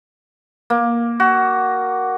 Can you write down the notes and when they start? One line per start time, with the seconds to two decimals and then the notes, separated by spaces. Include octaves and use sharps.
0.70 A#3
1.20 F#4